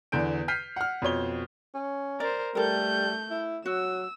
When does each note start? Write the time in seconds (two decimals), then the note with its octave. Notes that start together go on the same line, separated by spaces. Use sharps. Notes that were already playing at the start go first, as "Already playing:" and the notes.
0.12 E2 D3 G6 D7
0.48 F6 G6 B6 C7 D#7
0.76 F#5 F6
1.02 F2 B2 C#5 G7
1.74 C#4
2.20 A#4 C5 D5
2.55 G3 A3 A4 A#4 G6
3.30 E4
3.66 F#3 F#4 E6